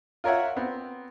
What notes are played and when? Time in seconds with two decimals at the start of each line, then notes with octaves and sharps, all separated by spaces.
0.24 F4 A#4 C#5 E5 F#5
0.56 B3 C4